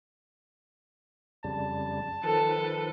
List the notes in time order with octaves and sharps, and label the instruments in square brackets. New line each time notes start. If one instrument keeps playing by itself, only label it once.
[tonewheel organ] F2 C#3 G3 [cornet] A5
[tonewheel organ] D#3 F3 B4 [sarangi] A4